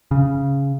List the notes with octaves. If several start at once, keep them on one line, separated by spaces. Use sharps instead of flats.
C#3